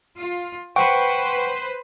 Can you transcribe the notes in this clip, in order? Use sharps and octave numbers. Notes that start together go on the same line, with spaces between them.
F4
B4 C5 F#5 G5 C#6